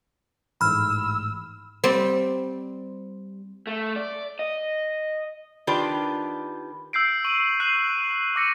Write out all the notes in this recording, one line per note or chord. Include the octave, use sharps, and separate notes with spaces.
A1 G#2 B5 E6 F6
G3 C4
A3
D5
D#5
D#3 D4 F4 G4 B4 D5
E6 G6 C7 D7
C#6 D#7 F#7
C#6 F#6 C7 D#7 E7 F#7
D6 E6 A#6 C#7 D#7